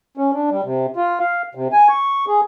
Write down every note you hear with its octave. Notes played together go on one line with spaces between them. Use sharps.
C#4
D4
G3
C3
F4
F5
C3
G#5
C#6
G#4